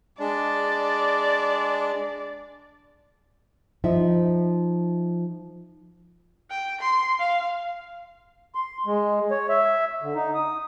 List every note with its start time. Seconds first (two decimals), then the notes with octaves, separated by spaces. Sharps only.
0.20 G#3 D4 D5
3.84 F3 D#4 E5
6.50 G5
6.80 C6
7.19 F5
8.55 C6
8.86 G#3
9.31 C#5
9.49 E5
10.02 D3
10.15 D#4
10.35 D#6